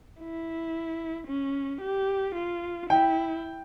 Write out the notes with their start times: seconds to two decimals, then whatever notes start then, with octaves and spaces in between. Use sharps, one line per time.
0.21 E4
1.28 C#4
1.82 G4
2.35 F4
2.90 E4 G5